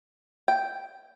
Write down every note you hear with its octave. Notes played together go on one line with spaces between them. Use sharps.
G5